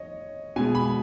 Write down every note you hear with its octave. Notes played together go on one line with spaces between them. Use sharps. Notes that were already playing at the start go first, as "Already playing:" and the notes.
Already playing: C#5 D#5
B2 G#3 G#5
B5